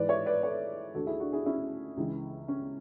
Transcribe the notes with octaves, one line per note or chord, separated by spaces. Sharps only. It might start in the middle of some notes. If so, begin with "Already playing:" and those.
Already playing: G#2 E3 B4 D5
C#5 E5
B4 D5
A4 C#5
D2 D3 F#4 A4
E4 G#4
D4 F#4
E4 G#4
C#4 E4
C#2 C#3 E3
C#4